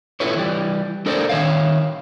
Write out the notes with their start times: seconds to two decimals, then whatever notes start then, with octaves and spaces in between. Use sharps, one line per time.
0.20 E4 F4 A4 B4 C#5
0.36 E3 G3
1.06 D4 A4 A#4 C5 D5
1.29 D#3 A3 C#5 E5 F5